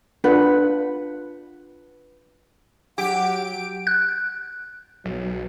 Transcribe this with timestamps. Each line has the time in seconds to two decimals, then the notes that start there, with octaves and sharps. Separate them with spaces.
0.24 D4 F4 B4 F#5
2.98 F#3 G4 F#5 D7
3.87 F#6
5.05 B1 F#3